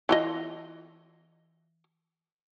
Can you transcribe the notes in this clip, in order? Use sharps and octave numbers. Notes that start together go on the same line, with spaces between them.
E3 F4 D#5